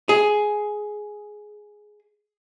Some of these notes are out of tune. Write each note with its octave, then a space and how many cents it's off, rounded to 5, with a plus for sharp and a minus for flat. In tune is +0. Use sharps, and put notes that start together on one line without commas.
G#4 +10